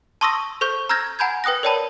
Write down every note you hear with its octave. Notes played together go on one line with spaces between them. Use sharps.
A5 C6 C#6 D#6 E6 A#6
A4 C5 C#6 G6
A#5 E6 F6 G6 G#6 A#6
F#5 G#5 A#5 B5 G6 G#6
B4 G5 D#6 F#6 A#6
A#4 C#5 D5 G5 A5 B5